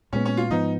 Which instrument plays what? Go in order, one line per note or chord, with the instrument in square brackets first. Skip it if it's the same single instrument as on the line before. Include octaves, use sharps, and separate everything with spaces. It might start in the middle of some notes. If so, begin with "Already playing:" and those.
[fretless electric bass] A#2 G#3 B3 [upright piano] C#4
[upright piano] C#4
F4
[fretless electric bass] G#2 F3 B3 [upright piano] D#4